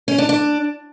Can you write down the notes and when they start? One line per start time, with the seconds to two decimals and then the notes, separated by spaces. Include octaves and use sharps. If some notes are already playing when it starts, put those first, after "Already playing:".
0.08 C#4
0.18 D4
0.29 D4